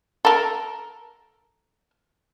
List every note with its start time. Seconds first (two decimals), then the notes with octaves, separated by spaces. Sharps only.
0.25 A4 A#4